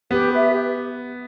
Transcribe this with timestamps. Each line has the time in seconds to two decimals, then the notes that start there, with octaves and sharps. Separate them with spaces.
0.11 B3 G4
0.32 B4 E5
0.53 G4